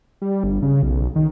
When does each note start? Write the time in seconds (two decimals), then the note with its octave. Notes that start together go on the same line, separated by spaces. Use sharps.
0.22 G3
0.44 G1
0.62 C#3
0.83 B1
1.16 D#3